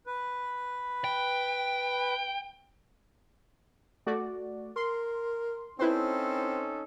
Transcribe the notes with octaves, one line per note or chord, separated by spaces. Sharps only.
B4
G5
A3 F#4 D5
A#4 C6
C4 C#4 D#4 E4 A4 B4 C5